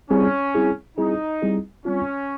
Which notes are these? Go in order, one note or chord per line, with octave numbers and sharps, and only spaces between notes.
G3 C4 C#4 E4 G#4
G3 C4 E4 G#4
G3 C4 D#4 E4 G#4
G3 C4 E4 G#4
G3 C4 C#4 F4